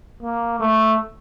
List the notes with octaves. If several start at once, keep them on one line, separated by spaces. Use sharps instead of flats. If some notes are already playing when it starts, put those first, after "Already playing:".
A#3
A3